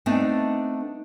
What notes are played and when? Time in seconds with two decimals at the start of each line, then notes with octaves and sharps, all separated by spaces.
0.06 A3 B3 C4 D4 D#4